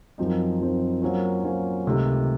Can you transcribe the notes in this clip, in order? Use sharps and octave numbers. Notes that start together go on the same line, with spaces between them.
F#2 F3 C4 D#4
F#2 F3 C4 D#4
F#3 A#3 C#4 F4 C5
F#3 A#3 C#4 F4 C5
C#2 C3 D#3 A3